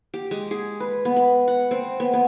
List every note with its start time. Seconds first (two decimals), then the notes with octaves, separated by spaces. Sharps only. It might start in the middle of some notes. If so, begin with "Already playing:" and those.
0.14 G4
0.31 G#3
0.51 G#4
0.80 B4
1.05 B3
1.16 B5
1.48 F#5
1.71 C4
2.00 B3
2.14 B3